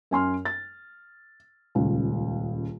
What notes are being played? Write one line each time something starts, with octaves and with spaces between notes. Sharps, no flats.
F#2 G#5 C6 F6
A6
D#1 C#2